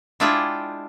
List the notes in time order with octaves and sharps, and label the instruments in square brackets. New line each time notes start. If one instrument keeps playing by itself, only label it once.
[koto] G#3 D4 E4 F4 G#4 G5